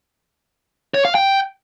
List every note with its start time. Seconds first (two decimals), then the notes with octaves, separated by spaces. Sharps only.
0.94 C#5
1.05 F5
1.15 G5